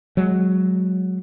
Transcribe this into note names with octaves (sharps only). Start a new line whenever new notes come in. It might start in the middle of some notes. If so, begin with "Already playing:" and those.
F#3 G#3